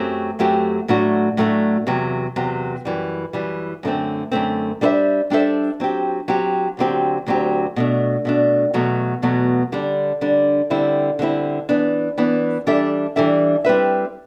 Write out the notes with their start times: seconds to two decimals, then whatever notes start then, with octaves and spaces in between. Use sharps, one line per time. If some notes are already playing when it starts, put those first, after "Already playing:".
Already playing: F#2 F#3 A3 C4 G4
0.39 F#2 F#3 A3 C4 G4
0.88 A2 F#3 A3 D4 F#4
1.37 A2 F#3 A3 D4 F#4
1.87 E2 C3 F#3
2.36 E2 C3 F#3
2.85 F#2 E3 G3
3.33 F#2 E3 G3
3.83 F#2 D3 A3 C4
4.32 F#2 D3 A3 C4
4.81 G3 D4 A4 C5 E5
5.30 G3 D4 A4 C5 E5
5.80 F#3 C4 G4
6.28 F#3 C4 G4
6.77 D2 D3 F#3 C4 G4
7.26 D2 D3 F#3 C4 G4
7.76 B2 A3 D4
8.25 B2 A3 D4
8.74 E2 B2 F#3 A3
9.22 E2 B2 F#3 A3
9.72 D3 G3 D4
10.21 D3 G3 D4
10.70 D3 G3 C4 E4
11.19 D3 G3 C4 E4
11.69 E3 B3 D4
12.18 E3 B3 D4
12.67 E3 G3 D4 A4 E5
13.16 E3 G3 D4 A4 E5
13.65 G3 C4 E4 B4 E5